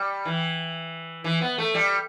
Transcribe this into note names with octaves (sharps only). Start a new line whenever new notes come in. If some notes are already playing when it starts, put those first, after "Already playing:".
Already playing: G3
E3
E3
B3
A3
G3